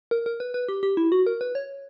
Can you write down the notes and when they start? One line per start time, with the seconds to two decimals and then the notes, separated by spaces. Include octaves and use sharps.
0.11 A#4
0.26 A#4
0.40 B4
0.54 B4
0.69 G4
0.83 G4
0.97 E4
1.12 F#4
1.27 A#4
1.41 B4
1.55 C#5